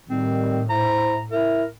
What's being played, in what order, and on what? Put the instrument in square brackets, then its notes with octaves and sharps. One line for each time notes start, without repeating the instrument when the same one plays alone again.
[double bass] A2 [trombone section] D#3 G3 [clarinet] C4
[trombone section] E4 C5 [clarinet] A#5
[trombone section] E4 [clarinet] A#4